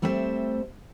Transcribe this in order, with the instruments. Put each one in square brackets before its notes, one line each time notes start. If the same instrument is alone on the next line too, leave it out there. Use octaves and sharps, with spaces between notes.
[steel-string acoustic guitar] G3 A3 C4 C5 C#5 E5